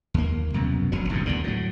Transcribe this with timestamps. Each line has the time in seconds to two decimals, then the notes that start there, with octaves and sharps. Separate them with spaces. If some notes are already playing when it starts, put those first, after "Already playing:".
0.14 D#2 A#3
0.54 C2 F#2 B2
0.92 E1 A#1 D3 F#3
1.09 F#1 C2 G2 A#2
1.26 D2 B2 D3
1.44 A2 F#3